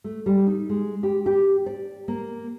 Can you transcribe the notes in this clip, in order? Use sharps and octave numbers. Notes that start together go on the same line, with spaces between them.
A3
G3
D#4
G#3
G4
G4
D5
A#3